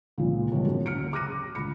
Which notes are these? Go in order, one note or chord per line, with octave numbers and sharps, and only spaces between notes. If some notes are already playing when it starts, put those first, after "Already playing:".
C#2 A#2 F3
A2 E3 G3 G#3 A#3 B3
F#2 A2
F#1 D2 F6 C#7 D7
D6 F6 F#6 A#6 D#7
C#2 B5 C#7